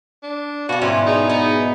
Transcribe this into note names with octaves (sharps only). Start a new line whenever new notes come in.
D4
B2 F#4 G4 F5
G#2 C#4 E4 D5 C6
D#4 G#4
B3 D#4